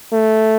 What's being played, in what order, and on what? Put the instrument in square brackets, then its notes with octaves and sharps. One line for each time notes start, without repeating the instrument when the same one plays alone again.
[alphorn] A3